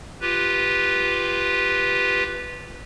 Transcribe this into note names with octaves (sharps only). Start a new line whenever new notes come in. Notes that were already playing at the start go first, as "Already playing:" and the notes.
F4 G4 B4